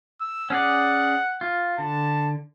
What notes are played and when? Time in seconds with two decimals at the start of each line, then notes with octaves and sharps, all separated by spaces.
0.21 E6
0.50 C#4 G#4 D5 F#5
1.41 F4
1.78 D3 A5